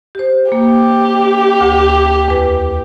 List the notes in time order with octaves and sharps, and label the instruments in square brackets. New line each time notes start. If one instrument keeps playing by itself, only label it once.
[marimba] G4 C5
[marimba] A#3 [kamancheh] G4
[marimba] D2
E2 B4